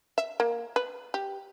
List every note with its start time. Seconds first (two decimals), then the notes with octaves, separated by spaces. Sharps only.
0.18 E5
0.40 A#3
0.76 B4
1.14 G4